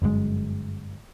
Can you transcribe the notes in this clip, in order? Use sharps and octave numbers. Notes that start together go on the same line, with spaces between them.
G1 F#2 A2 G#3